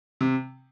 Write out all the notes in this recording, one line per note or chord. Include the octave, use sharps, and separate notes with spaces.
C3